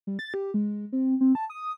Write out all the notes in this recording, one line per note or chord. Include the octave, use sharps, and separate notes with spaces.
G3
A6
G4
G#3
C4
C4
A5
D#6